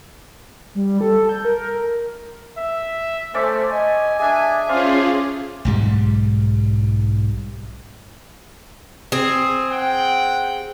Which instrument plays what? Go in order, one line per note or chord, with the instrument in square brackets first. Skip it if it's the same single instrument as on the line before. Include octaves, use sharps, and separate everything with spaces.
[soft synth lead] G3
A4
G6
A#4
[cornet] E5
[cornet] A3 [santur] C#4 D5 E5 [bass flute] C5
[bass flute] D#5 [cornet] G#5
[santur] D4 G#4 [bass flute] E5 [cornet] G#5
[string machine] C#4 F4 G#4 [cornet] C5 [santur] D5 F5
[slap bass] B1 G#2 G3
[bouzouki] C4 G#4
[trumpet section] F#5 G5